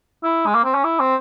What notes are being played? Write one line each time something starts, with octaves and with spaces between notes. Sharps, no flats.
E4
G#3
A#3
C4
C#4
E4
C4